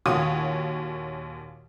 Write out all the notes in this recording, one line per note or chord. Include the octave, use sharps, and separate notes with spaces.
D#2 A#2 F#4 C#5 D#6 D#7